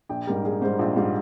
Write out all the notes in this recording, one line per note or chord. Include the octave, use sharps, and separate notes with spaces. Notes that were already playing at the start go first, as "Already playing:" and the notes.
A#1 G5
G#2 G3 A#4
A#1 G#4
G#2 G3 C5
A#1 F4
G#2 G3 F4